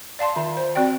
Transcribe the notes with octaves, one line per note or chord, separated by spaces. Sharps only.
D5 F5 A5 C6
D#3 F4 E5
C5
C4 F#4 D5 G5